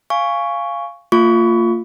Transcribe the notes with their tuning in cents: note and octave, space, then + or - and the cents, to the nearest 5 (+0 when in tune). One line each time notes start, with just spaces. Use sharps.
F5 -10 G#5 +0 C#6 +5
A#3 -40 F4 +0 C#6 +30